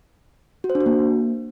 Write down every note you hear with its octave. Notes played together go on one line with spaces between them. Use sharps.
F#4
C5
D4
F#4
A#3